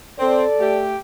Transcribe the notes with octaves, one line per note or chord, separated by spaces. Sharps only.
C4 A4 D5
A3 G4